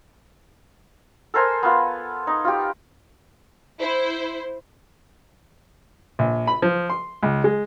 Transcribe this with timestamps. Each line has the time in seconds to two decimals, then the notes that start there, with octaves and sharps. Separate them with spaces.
1.34 A4 A#4 C5 G#5
1.63 B3 F4
2.27 D#4
2.45 F4 G4
3.80 E4 C5
6.19 A#1
6.47 B5
6.62 F3
6.90 C6
7.23 C#2
7.44 G#3